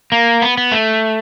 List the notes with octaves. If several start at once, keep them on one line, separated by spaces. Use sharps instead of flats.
A#3
B3
B3
A3